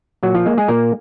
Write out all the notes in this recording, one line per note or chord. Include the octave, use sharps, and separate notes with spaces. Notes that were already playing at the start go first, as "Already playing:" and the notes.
A#2 F#3 F#4
F3 F4
G#3 A#3
G#3 G#4
A#2 A#3 A#4